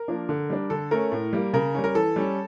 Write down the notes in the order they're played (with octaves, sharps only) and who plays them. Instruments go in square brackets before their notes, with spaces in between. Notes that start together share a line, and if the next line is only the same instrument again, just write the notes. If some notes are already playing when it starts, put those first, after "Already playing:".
Already playing: [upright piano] A#4
F3 A#3 D4
D3
G3 D4
D3 A4
A3 C#4 A#4
A2
G3 A#3
C#3 A#4
G3 C#4
A#4
E3 A4
G3 C#4